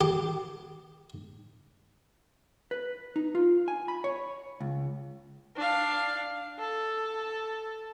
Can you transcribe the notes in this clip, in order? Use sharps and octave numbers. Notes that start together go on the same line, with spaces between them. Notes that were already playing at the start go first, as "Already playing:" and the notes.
G4
B4
D#4
F4
G#5
B5
C#5
C#2
D4 F5
A4